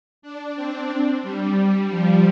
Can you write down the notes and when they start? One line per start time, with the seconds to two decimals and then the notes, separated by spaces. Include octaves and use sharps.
0.22 D4
0.56 C4
1.23 G3
1.89 F3